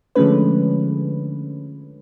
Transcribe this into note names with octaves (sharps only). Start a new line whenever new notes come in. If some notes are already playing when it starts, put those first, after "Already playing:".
D3 F3 G#3 A3 C#4 B4